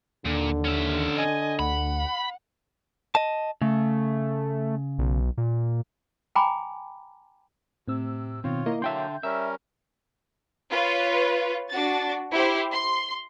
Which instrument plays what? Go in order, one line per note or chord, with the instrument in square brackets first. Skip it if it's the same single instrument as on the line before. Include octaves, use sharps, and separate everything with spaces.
[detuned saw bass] D#2 [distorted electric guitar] A#2 [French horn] D3
[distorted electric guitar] C#4 E5
[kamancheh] D#5 G#5
[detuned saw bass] D2 [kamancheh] F#5 [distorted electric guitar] B5
[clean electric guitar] D#5 A5
[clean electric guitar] C#3 [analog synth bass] A3
[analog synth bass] B1
A#2
[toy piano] G5 G#5 A#5 B5 D6
[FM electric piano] A2 C4 E6 [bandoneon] C3
[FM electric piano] B2 D#3 [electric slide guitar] C4 [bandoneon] F4 C#5
[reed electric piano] A#3 [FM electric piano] E4 [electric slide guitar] D#5
[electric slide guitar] D3 A5 [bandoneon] F#3 A#3 [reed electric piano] E5 G5 C6 [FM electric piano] G6
[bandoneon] G3 C#4 A#4 [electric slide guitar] E5 [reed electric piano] E6
[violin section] F4 B4 C#5
D4 F#4 A6
E4 G4 C5
C6